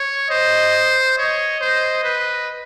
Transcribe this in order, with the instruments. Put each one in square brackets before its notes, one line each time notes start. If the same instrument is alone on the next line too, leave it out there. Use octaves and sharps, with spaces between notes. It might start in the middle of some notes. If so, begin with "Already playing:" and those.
Already playing: [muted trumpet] C#5
[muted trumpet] C5 [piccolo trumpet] D#5
[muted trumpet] C#5 [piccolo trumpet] D#5
[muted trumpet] C5
B4